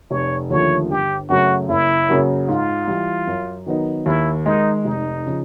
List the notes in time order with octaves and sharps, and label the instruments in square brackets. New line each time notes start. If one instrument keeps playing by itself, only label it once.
[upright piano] F1 [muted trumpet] C#5
[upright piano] D#2 D3 F3 A3 [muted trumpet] C#5
[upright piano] G1 [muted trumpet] G4
[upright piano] F#2 C#3 F#3 A3 [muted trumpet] F#4
[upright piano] F#1 [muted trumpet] E4
[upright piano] F#2 C#3 F#3 A#3
[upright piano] G#2 [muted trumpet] F4
[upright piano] E3 G3
F#2
D#3 F#3 B3 D#4
[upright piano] D#2 [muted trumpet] E4
[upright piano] D#3 G#3 [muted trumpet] D#4
[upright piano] F1 [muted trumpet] D#4
[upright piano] C#3 F3